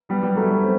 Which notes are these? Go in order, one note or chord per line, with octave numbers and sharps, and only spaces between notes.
G3 B3
G3 B3
F#3 A3
G3 B3
A3 C4